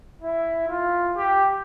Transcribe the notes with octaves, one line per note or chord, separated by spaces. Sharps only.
E4
F4
G4